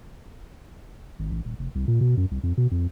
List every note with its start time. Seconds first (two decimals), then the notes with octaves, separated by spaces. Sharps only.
1.19 G#1
1.31 A1
1.45 D#1
1.59 F1
1.75 C2
1.88 A#2
2.01 B2
2.17 F#2
2.31 C2
2.43 F2
2.57 B2
2.71 F2